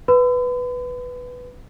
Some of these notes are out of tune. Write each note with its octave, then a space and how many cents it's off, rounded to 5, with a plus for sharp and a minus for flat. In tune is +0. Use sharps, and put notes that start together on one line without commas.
B4 +0 B5 +45